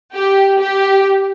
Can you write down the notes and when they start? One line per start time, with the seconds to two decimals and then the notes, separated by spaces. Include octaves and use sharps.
0.14 G4
0.60 G4